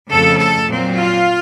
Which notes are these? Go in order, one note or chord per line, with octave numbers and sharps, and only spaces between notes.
F2 C#3 A3 A4
A4
A#2 F#3 C4
F4